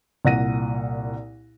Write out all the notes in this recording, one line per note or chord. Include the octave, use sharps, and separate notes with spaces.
C2 A#2 F#5 A#6 D#7